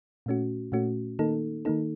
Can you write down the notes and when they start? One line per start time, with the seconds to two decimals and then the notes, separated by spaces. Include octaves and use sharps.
0.26 A#2 A3 C#4 F#4
0.72 A#2 A3 C#4 F#4
1.19 D#3 A#3 D#4 A4
1.65 D#3 A#3 D#4 A4